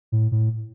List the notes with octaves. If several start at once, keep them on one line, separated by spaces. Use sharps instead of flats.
A2
A2